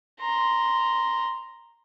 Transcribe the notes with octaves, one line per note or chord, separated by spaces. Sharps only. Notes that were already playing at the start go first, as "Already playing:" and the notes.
A#5 C6